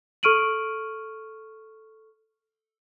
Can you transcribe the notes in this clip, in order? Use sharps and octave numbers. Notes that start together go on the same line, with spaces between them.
A4 C#6 F6 D7 D#7 F#7